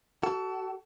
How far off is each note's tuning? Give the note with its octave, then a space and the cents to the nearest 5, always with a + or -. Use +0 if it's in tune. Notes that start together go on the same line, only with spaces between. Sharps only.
F#4 +30 A4 +0